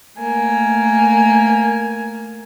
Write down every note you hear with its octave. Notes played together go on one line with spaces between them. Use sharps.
A3 A#3 G#5